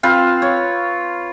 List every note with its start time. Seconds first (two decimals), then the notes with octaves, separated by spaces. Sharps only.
0.03 C4 F4 B4 F5
0.42 C#5